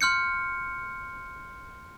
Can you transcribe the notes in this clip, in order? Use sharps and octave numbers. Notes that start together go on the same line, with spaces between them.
C6 F6 G6 C#7